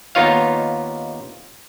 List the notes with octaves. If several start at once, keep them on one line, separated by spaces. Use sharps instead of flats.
D#2 B3 D#4 F4 C#5 F5